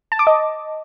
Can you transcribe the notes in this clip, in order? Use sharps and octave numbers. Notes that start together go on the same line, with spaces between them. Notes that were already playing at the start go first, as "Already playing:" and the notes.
A5
D6
D#5